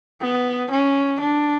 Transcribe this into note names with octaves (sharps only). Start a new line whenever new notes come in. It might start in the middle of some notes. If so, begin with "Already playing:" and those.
B3
C#4
D4